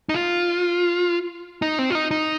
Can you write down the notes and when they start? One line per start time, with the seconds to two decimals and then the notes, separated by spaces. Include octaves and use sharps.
0.09 D#4
0.14 F4
1.62 D#4
1.79 C4
1.90 F4
1.95 D#4
2.11 D#4